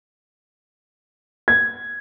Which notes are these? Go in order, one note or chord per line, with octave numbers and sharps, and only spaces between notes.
G#6